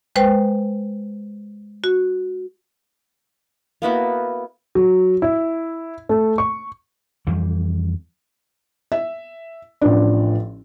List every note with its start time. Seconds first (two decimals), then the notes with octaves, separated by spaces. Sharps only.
0.16 G#3 B4 C5 G5
1.84 F#4
3.82 A#3 B3 E4 F#4
4.75 F#3
5.22 E4
6.09 A3
6.38 C#6
7.27 F2 E3 G3
8.92 E5
9.81 A1 F3 D4